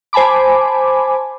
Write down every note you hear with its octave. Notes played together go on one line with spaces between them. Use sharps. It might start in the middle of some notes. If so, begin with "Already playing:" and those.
C5 G#5 A5 B5 D6